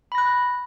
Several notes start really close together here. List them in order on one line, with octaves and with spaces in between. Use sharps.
B5 A#6 F#6